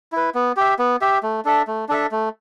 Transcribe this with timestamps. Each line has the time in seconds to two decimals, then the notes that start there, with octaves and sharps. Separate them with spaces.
0.12 E4 B4
0.35 B3
0.57 G4 E5
0.79 B3
1.01 G4 E5
1.23 A3
1.45 D4 A4 E5
1.67 A3
1.89 D4 A4 E5
2.11 A3